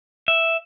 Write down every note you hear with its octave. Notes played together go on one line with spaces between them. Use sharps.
E5